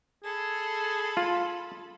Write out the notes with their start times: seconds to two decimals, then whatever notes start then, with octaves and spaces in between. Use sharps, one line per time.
0.24 G#4 A4 B5
1.17 F4